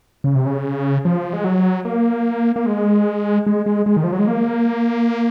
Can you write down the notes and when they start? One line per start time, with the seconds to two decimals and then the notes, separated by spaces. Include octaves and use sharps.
0.24 C#3
0.35 C3
0.46 C#3
1.05 F3
1.33 G#3
1.44 F#3
1.85 A#3
2.56 A#3
2.66 G#3
3.46 G#3
3.66 G#3
3.86 G#3
3.97 D#3
4.04 F3
4.12 F#3
4.19 G#3
4.27 A#3